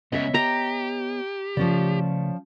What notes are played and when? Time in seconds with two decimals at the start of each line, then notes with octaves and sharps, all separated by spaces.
0.12 C#2 C#3 B3 C#5 D#5 E5
0.34 G4 A#5
1.57 C#3 F3 A3 C#4 D5